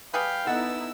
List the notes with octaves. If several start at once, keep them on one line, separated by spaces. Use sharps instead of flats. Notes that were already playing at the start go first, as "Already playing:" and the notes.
G3 G#4 B4 F5 G5
B3 D#4 E4 A4 F#5 E6